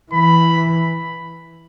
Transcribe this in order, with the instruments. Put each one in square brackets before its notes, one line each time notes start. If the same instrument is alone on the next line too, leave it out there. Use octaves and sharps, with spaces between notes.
[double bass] E3 [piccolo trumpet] B5